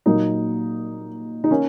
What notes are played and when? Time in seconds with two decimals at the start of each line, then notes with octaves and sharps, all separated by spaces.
0.06 A#2 F#3 A#3 D#4
1.44 D#4
1.51 A#3 C#4